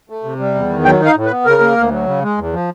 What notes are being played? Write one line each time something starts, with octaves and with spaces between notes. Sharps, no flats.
A3
C3
G3
E2
D#3
F#3 G5
D#4
F5
A2
B4
B3
C#3 A#4
A#3
D2
F#3
C#3
G#3
E2
F3